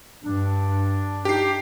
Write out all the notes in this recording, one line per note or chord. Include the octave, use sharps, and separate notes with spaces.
G2 D4
D#4 G4 C7